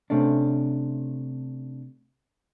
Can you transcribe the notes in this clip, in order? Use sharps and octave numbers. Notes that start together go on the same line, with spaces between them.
C3 A3 C#4 D4